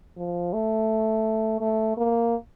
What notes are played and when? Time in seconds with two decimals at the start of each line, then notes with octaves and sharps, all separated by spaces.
0.17 F3
0.53 A3
1.61 A3
1.97 A#3